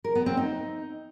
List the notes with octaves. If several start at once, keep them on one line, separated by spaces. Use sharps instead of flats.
A#4
B3
C4
D#4